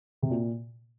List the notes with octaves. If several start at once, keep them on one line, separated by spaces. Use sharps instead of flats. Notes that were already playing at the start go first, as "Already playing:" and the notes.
C3
A#2